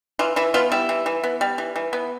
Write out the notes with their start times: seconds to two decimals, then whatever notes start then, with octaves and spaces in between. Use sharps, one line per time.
0.19 E3 F4
0.36 E3 E4
0.54 B3 F4
0.72 G3 E4
0.89 E3
1.06 E3
1.24 B3
1.41 G3
1.58 E3
1.76 E3
1.93 B3